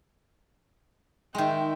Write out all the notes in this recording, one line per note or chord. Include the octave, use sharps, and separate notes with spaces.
D#3 G#3 E5 G5